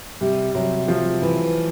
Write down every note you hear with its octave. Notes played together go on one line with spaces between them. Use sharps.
C3 G3
C3 F#3
F3 A3
E3